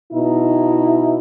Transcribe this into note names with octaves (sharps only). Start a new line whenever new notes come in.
B2 D#4 E4